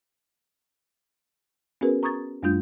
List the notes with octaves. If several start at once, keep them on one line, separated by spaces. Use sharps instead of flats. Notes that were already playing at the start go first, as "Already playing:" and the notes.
B3 C#4 F#4 G#4 A#4 B4
A#5 C#6 D#6 G#6 A6
F#2 G3 A3 D4 F4 G6